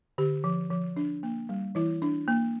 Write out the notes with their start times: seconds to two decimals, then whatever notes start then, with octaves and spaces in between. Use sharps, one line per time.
0.18 D3 G4
0.44 F3
0.70 F3
0.97 D4
1.23 A#3
1.49 G3
1.75 E3 E4
2.02 D4
2.28 A#3